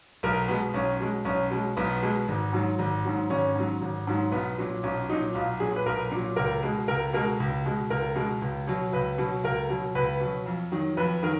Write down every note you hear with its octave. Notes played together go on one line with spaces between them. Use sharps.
B1 A#4
B2 G#3 B3
B1 C#4
B2 G#3
B1 C#4
B2 G#3
B1 B3
B2 G#3
G#1
G#2 F#3
G#1
G#2 F#3
G#1 C#4
G#2 F#3
G#1
G#2 F#3
B1 B3
A#2 F#3
B1 C#4
A#2 F#3 D#4
B1 F4
A#2 F#3 G#4
B4
B1 A#4
A#2 F#3
C#2 A#4
B2 G#3
C#2 A#4
B2 G#3 A#4
C#2
B2 G#3
C#2 A#4
B2 G#3
C#2
B2 F#3
C#2 B4
B2 F#3
C#2 A#4
B2 F#3
C#2 B4
B2 F#3
F2
D#3 F#3
F2 B4
D#3 F#3 A#4